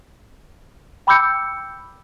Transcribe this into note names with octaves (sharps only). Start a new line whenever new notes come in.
G5 B5 D6 E6 G6 C#7